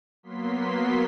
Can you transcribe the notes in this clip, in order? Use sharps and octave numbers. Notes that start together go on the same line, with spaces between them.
F#3 A#3 B3 C6 B6